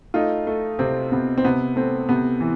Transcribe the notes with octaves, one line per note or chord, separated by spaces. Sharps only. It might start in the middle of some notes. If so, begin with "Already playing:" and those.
A3 D#4 F4
A3
C3 C4
C3 B3
C4
C3 B3
A3 C4
C3 B3
E3